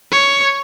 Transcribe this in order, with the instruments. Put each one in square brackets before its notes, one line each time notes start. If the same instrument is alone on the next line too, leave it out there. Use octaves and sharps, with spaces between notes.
[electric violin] C#5